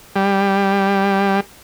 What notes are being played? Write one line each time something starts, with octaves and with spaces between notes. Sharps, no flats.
G3